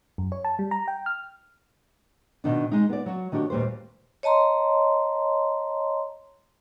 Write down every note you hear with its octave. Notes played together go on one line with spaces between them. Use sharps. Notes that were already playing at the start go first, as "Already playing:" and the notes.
F#2
C#5
A5
G3
A#5
G5
F6
B2 D#3 D4
G#3 D#4
B3 D5
F#3 F#4
D#3 D4 F#4 G4 C#5
D#2 A#2 G3 B4 C5
C#5 D#5 A5 A#5 C6